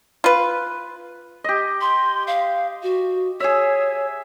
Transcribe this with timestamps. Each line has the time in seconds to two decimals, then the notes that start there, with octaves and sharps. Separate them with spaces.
0.24 F4 B4
1.44 G4 D#5
1.81 C6
2.27 F5
2.83 F#4
3.40 G#4 C#5 E5